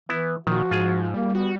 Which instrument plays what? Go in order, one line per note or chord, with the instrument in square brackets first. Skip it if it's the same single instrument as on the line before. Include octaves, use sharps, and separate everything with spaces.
[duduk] E3 [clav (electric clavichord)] B3 E4
[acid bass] A#2 [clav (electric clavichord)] D#3 [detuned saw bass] F3 [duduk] F#4
[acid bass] G#2 [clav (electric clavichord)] F4 G#4
[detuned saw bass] G3 [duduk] A#3
[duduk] B3 [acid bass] F#4